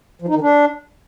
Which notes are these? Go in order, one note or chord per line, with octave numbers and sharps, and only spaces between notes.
F3
D#4
D#3
D4